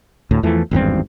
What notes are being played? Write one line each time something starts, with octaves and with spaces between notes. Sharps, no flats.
D2 A2
E2 E3 F3 A3
G#1 E2 G2 C4